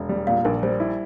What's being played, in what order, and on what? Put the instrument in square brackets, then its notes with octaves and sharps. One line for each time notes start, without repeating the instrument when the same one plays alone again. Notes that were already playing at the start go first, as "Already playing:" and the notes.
Already playing: [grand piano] E1
G3
[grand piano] A#2 [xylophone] F5
[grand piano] A#1 [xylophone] A#4
[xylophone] A#4
[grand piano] G3 [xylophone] C5
[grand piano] E4